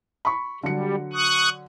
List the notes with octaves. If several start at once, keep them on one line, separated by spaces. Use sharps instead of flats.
B5 C#6
D3 F#3 G3 C#7
C#6 D#6 F#6